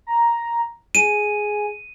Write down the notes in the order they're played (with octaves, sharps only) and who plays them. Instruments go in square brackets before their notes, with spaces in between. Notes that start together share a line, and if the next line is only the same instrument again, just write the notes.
[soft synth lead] A#5
[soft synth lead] G#4 [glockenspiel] D#7